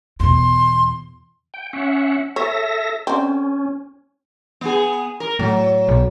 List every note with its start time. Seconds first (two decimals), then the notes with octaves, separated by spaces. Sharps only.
0.20 E2 B2 C6
1.54 G5
1.73 C#4 E5 F#5
2.36 A4 C#5 E5 A#6
3.07 D3 C4 C#4
4.61 B3 G#4
5.20 A#4
5.39 A2 F#3
5.89 B1